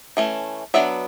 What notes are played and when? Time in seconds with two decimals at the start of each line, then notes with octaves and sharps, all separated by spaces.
0.17 E3 A3 C#4
0.74 F#3 B3 D4 E5